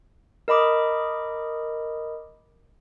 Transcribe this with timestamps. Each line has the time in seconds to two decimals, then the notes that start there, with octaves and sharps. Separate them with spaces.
0.48 A#4 D#5 B5 D6 D#6